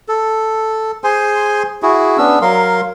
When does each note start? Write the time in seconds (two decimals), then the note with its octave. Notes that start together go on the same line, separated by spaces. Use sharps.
0.08 A4
1.04 G#4 C5 G#5 C6
1.83 E4 F#4 G#4
2.18 B3 C#4 D4 E6
2.42 F#3 A#4 F5 C6